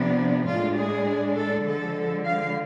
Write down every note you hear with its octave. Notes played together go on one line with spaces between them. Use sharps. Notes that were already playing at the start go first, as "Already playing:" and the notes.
Already playing: C3 F3 B3 D4
A2 G#3 D4 F4
G#4
A4
D3 F3 G#3 A4
F5